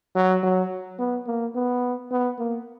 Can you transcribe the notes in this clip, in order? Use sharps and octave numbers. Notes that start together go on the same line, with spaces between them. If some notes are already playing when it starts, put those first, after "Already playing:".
F#3
F#3
B3
A#3
B3
B3
A#3